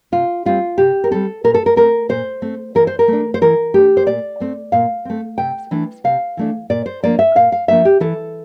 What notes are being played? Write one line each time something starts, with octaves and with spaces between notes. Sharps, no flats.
C3 F4
G3 C4 F4
C3 G4
A#4
G3 C4 A4
A#2 A#4
A4
A#4
A3 C4 A#4
A#2 C5
A3 C4
E3 A#4
C5
A#4
A3 D4
C5
E3 A#4
A3 D4 G4
C5
A#2 D5
A3 C4
A#2 F5
A3 C4
C3 G5
E3 A3 D4
C3 F5
E3 A3 D4
A#2 D5
C5
F3 A#3 D4 D5
E5
A#2 F5
F5
F3 A#3 D4 E5
G4
E3 A4